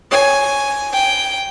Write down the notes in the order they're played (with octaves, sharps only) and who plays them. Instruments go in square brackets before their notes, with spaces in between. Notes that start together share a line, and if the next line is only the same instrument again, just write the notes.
[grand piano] C#5 [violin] G#5
[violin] G5